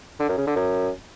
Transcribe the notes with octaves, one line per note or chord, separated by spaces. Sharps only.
D3
F#2
C#3
D3
F#2